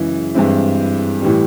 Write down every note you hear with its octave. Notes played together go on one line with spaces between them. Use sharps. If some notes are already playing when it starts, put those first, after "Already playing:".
Already playing: F#2 C#3 E3 G#3 C#4
G2 E3 G#3 C4 E4
A2 E3 G3